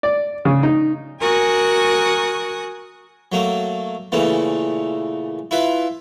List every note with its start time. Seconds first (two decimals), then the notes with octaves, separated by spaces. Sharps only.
0.03 D5
0.45 C#3
0.63 D#4
1.21 F#4 A#4 G#5 C#6 D#6 F#6
3.32 F#3 A3 A#3
4.12 A#2 C#3 E3 A3
5.51 E4 F4 B4